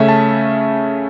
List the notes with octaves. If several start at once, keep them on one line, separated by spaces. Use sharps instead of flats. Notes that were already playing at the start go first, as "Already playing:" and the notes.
Already playing: C#3 A3 C#4 E5
A5